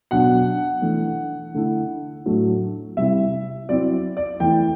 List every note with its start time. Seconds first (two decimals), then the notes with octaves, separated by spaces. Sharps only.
0.11 B2 F#3 B3 D4 F#5
0.82 E3 A3 D4
1.54 D3 A3 E4
2.26 A2 F#3 A3 D4
2.97 C3 G3 C4 E4 E5
3.69 F#3 C4 E4 D5
4.17 D5
4.40 E3 A3 E4 G5